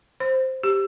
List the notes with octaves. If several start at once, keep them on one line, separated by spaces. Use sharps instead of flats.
C5
G4